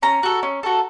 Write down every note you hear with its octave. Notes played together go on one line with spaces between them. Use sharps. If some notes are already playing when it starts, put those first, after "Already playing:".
C#4 A#5
F#4 A4
C#4
F#4 A4